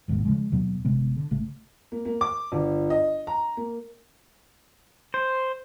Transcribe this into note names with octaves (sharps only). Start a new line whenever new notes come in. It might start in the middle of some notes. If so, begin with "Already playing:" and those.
G#1 D#2 G#2 B2
C#3 E3 F3 G#3
D#2 B2 F#3 B3
G1 C3 G#3 B3
D3
G#1 C#3 A3
A#3
A#3
D6
G1
D#5
A#5
A#3
C5